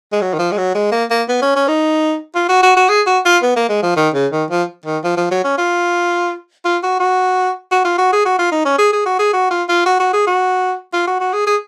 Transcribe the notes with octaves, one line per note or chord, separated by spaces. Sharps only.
G#3
F#3
D#3
F3
G#3
F#3
G#3
A#3
A#3
B3
C#4
C#4
D#4
F4
F#4
F#4
F#4
G#4
F#4
F4
B3
A#3
G#3
F3
D#3
C#3
D#3
F3
D#3
F3
F3
F#3
C#4
F4
F4
F#4
F#4
F#4
F4
F#4
G#4
F#4
F4
D#4
C#4
G#4
G#4
F#4
G#4
F#4
F4
F4
F#4
F#4
G#4
F#4
F4
F#4
F#4
G#4
G#4